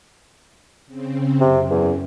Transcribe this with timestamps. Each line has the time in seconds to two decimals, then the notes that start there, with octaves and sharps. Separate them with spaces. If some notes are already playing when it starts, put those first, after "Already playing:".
0.87 C#3 C4
1.41 F#2 C3
1.70 E2